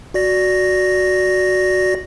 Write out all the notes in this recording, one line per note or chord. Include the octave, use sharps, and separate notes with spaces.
F#4 D5 A#6